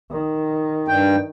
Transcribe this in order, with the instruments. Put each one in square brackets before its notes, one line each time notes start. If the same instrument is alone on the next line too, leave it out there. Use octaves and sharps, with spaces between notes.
[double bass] D#3
[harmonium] G2 G5